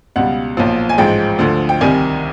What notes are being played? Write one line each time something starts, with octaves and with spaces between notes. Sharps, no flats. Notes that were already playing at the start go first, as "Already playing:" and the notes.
C#2 B2 G3 F#5
B1 A#2 F3
G#5
A1 G#2 F3 G#3 G5
D2 D3 F3
G5
C2 C3 D#3 G3 G#5